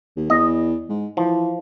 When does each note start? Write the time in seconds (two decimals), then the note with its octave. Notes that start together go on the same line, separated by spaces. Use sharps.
0.16 D#2
0.30 E2 D#5
0.89 G#2
1.17 E3 F3